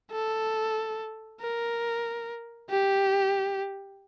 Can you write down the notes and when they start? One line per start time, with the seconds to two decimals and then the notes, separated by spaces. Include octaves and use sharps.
0.12 A4
1.41 A#4
2.70 G4